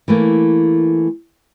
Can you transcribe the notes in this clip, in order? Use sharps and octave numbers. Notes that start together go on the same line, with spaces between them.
E3 A3 A#3